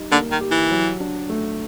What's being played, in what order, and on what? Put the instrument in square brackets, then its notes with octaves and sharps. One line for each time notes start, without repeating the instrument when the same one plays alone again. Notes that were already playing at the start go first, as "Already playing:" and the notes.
Already playing: [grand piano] G3 D#4
[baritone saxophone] D3 [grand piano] A#3
[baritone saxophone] D#3
[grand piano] G4
[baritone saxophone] E3
[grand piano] F#3
D4
A3